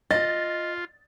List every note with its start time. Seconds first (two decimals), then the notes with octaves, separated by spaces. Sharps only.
0.11 F4 D#5 A6